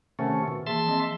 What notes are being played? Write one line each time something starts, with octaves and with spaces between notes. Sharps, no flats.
C3 D#3 A3 C#4 A#4 F#5
B2
E3 A#3 G#4 E5 A5 C6
F3 C4 D#5